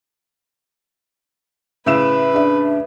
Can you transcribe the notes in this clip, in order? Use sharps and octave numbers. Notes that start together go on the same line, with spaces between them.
A2 C#3 B4 E5 E6 E7
D4 G#4 D5 E5